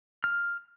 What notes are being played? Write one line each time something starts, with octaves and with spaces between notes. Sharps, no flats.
F6